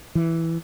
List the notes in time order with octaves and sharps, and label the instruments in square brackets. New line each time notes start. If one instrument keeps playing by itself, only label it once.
[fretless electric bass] E3